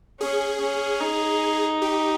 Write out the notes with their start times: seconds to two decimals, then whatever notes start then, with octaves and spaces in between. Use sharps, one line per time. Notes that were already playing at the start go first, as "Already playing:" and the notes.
0.20 C#4 G#4
0.61 C#4
1.01 D#4
1.82 G4